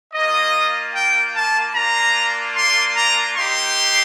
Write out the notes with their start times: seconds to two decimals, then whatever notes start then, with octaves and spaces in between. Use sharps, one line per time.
0.13 A#3 F4 D#5
0.93 G5
1.33 A5
1.73 A#3 D4 F4 A#5
2.55 C6
2.95 A#5
3.34 A#3 D#4 G4 C6